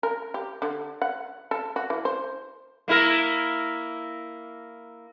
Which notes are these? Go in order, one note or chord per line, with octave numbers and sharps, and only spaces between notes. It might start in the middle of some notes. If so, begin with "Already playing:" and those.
A#4
G4
D3
F#5
A4
F#4
E3
C5
A#3 E4 A#4